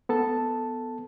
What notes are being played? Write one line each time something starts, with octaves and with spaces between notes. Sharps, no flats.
B3 A4 A5